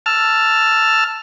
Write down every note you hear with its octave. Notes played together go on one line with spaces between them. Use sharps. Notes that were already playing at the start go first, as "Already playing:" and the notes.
A5 E6 F6